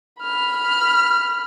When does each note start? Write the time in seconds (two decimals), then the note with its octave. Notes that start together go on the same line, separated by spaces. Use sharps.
0.21 B5 F6